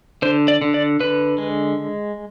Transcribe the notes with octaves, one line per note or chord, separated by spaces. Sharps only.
D3 C5
D5
D3
D5
D3 B4
G#3